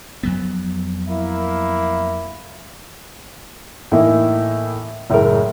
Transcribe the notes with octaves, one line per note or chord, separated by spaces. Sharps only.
F2 F#3 B3
A#3 E4
A2 E3 A#3 D#4 E4
F#1 A2 G#3 A#4